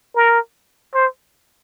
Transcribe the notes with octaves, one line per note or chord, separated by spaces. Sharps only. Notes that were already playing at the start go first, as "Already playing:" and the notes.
A#4
C5